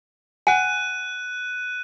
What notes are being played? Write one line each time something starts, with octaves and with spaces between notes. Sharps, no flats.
F#5 G#5 F#6 D#7